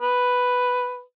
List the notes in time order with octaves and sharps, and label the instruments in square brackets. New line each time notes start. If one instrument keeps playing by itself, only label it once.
[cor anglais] B4